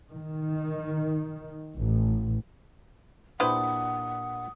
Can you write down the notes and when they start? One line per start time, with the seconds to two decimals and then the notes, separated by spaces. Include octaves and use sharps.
0.12 D#3
1.74 A1
3.40 A#2 D4 E4 G4 B4 C5 F#5 D#6